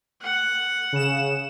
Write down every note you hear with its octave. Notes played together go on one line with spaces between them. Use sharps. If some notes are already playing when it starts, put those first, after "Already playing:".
F#5
C#3 E7